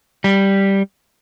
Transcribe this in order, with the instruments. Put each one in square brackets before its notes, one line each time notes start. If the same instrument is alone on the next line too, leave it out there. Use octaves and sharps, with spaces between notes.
[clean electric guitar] G3